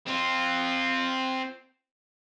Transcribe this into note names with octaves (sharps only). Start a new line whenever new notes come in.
C4 F4